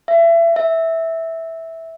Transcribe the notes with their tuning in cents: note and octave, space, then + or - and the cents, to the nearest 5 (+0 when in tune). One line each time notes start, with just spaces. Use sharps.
E5 +30
E5 -10